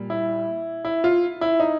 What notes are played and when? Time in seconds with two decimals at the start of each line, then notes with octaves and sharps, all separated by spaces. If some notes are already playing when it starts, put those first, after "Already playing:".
Already playing: A#2 G3
0.10 E4
0.85 E4
1.04 F4
1.41 E4
1.60 D#4